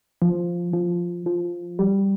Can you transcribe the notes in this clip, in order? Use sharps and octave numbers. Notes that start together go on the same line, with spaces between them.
F3
F3
F3
G3